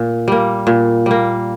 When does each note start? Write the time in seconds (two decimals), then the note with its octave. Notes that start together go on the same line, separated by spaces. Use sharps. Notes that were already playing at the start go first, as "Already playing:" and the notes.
Already playing: A#2
0.28 G3 A#3
0.67 A#2
1.06 G3 A#3